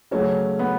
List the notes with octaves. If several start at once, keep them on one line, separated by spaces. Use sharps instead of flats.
C#3 F#3 A3 C#4
B3